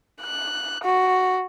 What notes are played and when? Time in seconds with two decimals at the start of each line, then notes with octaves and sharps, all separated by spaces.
0.22 F#6
0.84 F#4